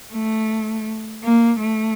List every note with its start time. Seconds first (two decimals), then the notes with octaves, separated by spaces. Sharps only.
0.13 A3
1.24 A#3
1.60 A3